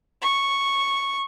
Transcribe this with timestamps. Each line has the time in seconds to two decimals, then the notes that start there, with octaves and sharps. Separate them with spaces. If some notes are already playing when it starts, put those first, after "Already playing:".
0.21 C#6